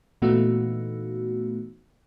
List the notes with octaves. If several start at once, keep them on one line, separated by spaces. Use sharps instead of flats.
A#2 E3 A3 B3 D#4 F#4